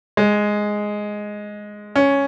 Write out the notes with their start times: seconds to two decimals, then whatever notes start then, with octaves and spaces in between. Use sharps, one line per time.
0.17 G#3
1.96 C#4